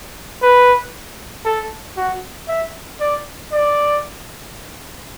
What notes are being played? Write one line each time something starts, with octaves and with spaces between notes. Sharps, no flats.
B4
A4
F#4
E5
D5
D5